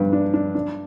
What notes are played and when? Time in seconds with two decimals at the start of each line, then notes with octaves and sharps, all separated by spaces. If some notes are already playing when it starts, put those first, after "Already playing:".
Already playing: G2 B3
0.13 D4
0.34 D4
0.55 D4